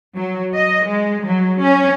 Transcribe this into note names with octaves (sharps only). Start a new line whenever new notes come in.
F#3
D#5
G#3
F#3
C#4